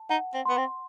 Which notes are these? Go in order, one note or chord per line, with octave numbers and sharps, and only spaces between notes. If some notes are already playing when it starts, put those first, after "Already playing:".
Already playing: A5
D#4 F#5
C4
B3 C6
C4